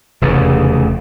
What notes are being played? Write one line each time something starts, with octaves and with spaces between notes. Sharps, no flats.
F1 E2 C#3